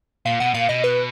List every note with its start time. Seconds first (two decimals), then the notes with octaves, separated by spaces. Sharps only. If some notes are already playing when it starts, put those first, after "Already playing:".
0.25 A#2 F5
0.40 B2 F#5
0.54 A#2 F5
0.69 B2 D#5
0.84 B4